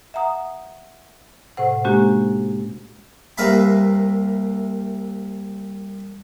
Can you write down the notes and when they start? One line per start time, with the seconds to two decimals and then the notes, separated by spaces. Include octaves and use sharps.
0.14 E5 F#5 A#5 D#6
1.57 A2 C3 C5 F#5
1.85 G#3 A#3 C#4 D4 F#4 G4
3.38 C2 A#3 B4 E5 F5 B5